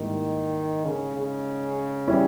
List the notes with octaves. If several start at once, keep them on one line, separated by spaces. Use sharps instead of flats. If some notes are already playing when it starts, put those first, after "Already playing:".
Already playing: G#2 D#3 G3 A#3 E4
C#3
C#3
G3 C#4 E4